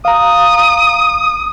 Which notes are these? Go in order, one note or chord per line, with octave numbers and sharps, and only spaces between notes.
F5 A#5 D#6